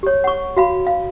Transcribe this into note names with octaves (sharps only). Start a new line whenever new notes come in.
G4 C#5
F#5 C#6
F#4 F5 B5
F5